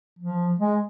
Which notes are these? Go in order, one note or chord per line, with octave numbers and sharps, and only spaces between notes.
F3
G#3